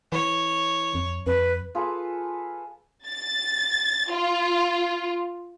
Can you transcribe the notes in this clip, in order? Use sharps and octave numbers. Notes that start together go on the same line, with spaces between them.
E3 C#5
F2
F2 B4
F4 G#4 A4 B4
A6
F4